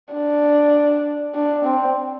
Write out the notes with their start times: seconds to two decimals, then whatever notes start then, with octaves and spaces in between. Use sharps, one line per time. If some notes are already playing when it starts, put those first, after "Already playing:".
0.14 D4
1.35 D4
1.65 C4